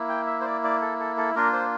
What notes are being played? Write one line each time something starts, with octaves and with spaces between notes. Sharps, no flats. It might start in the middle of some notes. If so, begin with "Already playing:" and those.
Already playing: A#3 E4
G5
E5
C5
D5
D5
A4
A4
A4
A#3 D4 F4 A#4
C5